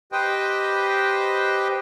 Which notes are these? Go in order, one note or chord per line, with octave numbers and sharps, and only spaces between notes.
G4 B4 C5 D#5 G5